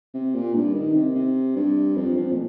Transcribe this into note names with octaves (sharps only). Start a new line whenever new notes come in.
C3
A#2
G2
D#3
C3
C3
G2
F2
F2
A#2